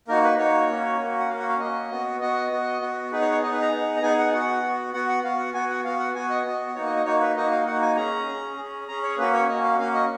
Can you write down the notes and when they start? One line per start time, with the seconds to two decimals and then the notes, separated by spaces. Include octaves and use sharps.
0.08 A#3 D#4 F#4 A#4
0.23 B4
0.38 A#3 D#4 F#4 C#5
0.69 A#3 C#4 F#4
0.99 A#3 C#4 F#4
1.20 F#5
1.29 A#3 C#4 F#4 F5
1.40 F#5
1.49 F5
1.59 A#3 C#4 F#4 D#5
1.91 B3 F#4
2.20 B3 F#4 D#5
2.51 B3 F#4
2.81 B3 F#4
3.12 B3 D#4 G#4 B4
3.21 C#5
3.32 C#5
3.42 B3 D#4 G#4 D#5
3.52 B4
3.62 A#5
3.72 B3 D#4 G#4
3.96 A#5
4.02 B3 D#4 G#4 G#5
4.18 F#5
4.32 B3 F#4 F#5
4.63 B3 F#4
4.93 B3 F#4 F#5
5.09 F#5
5.24 B3 F#4 F5
5.39 F#5
5.54 B3 F#4 G#5
5.70 F#5
5.85 B3 F#4 F5
5.99 F#5
6.15 B3 F#4 G#5
6.30 D#5
6.45 B3 F#4
6.75 A#3 D#4 F#4 C#5
6.85 D#5
6.96 D#5
7.05 A#3 D#4 F#4 C#5
7.21 B4
7.36 A#3 D#4 F#4 D#5
7.51 F5
7.66 A#3 D#4 F#4 F#5
7.82 G#5
7.96 C#4 G#4 A#5
8.27 C#4 G#4
8.57 C#4 G#4
8.88 C#4 G#4 A#5
9.03 C#5
9.18 A#3 C#4 F#4 B4
9.33 C#5
9.49 A#3 C#4 F#4 D#5
9.64 F5
9.79 A#3 C#4 F#4 F5
9.94 D#5